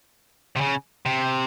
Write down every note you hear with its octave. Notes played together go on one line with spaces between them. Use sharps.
C3
C#3
C3